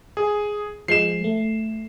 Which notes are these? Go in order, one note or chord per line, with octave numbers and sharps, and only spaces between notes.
G#4
F3 G#3 C7 E7
A3